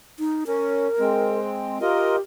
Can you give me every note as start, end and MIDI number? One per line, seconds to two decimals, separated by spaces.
0.19 0.44 63
0.47 0.88 61
0.47 1.39 70
0.99 1.78 56
0.99 1.78 60
1.81 2.16 65
1.81 2.21 67
1.81 2.16 70
1.81 2.16 75